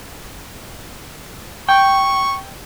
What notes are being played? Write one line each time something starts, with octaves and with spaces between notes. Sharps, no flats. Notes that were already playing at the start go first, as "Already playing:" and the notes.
G5 C#6